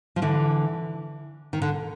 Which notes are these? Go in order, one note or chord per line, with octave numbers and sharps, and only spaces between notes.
F3
D3 E3
D#3
D3